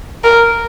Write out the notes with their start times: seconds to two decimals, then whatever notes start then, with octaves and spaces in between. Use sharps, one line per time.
0.24 A#4